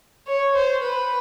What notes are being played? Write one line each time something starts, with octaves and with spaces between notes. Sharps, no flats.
C#5
C5
B4